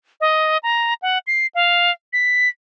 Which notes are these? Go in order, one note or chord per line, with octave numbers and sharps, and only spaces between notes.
D#5
A#5
F#5
C7
F5
B6